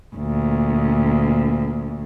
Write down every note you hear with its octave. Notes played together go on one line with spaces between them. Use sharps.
D2 A#2